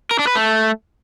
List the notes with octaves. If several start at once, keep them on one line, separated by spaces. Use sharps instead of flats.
A#4
D4
B4
A3